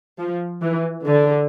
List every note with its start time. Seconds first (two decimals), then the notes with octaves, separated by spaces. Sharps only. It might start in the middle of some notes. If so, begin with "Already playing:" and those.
0.19 F3
0.63 E3
1.05 D3